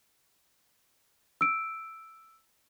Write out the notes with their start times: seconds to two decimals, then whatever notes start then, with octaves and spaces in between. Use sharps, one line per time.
1.41 E6 D7